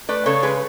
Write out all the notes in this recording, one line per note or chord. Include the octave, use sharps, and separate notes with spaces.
A3 B4 D5
C#3 A4 C#5
G#3 G#4 B4